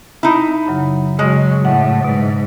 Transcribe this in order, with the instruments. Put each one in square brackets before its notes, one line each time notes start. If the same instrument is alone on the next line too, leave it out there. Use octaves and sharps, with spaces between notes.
[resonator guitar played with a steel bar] D#4 E4
[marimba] F#2 C#3 F#3
[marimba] C#3 [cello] F#3 [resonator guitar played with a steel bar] G#3
[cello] A2 [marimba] F#5
[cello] G#2 [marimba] B2